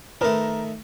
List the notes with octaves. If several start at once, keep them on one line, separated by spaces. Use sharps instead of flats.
D#3 A3 A#4 B4 A#5